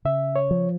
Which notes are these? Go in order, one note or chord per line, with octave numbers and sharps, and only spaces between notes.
C#3 E5
C#5
F3